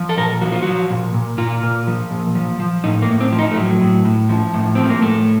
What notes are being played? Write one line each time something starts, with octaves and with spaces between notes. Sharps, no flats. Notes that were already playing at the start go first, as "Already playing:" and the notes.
Already playing: F3
A4
A#2 A#4
F3 F#4
F4
F3 F#4
A#2
A#2
A#2 F4
A#2
F3
A#2
F3
F3
A2 D#4
A#3
A2
C4
F3
D#4
A3
A2 F#3
A2
A2
F3
A2
F3 C4
A#3
A2 A3